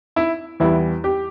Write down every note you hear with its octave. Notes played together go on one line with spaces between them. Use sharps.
E4
E2 E3 G3 B3 E4
G4